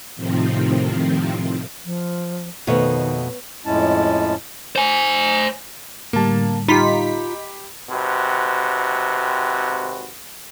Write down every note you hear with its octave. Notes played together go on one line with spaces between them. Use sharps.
A2 C3 D#3 F3 C4
F3
F2 B2 D#3 A3 B3 C#5
F2 A2 G#3 C#4 E4 A5
C5 G#5
A2 D3 G3 A#3 A5
D#4 F4 G4 B5 B6
G#1 C3 F#4 B4